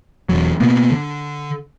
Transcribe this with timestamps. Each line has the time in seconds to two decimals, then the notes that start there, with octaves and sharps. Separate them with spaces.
0.29 E1 E2 F#3
0.60 B2 A#3 B3
0.92 D3